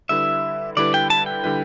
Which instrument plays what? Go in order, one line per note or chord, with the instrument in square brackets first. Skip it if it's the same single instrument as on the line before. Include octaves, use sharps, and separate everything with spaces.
[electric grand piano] D3 G3 E4 B4 [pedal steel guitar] E5
[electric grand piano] D3 G3 E4 B4 [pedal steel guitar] D5
[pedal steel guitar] G5
A5
G5
[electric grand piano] D3 G3 E4 B4